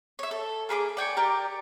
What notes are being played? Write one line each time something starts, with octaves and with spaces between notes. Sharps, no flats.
C#5 E5
A4
A#3 G#4 B5 D6
D5 G5 G#5 C#6
G4 A#4 D5